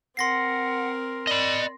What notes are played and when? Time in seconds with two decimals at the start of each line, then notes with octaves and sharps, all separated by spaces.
0.17 C4 A#4 F#5 C6 A#6 C7
1.27 D5 D#5 B5